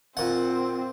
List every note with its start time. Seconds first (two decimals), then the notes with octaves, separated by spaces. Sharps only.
0.17 A#2 C4 F#5